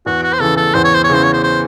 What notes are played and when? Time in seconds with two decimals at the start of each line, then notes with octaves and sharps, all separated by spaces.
0.06 E2 F#4
0.23 F#4
0.33 C5
0.40 C#3 E3 A4
0.57 A4
0.74 E2 C5
0.84 C#5
0.94 C5
1.04 C#5
1.09 C#3 E3 C5
1.23 C#5
1.33 C5
1.43 C5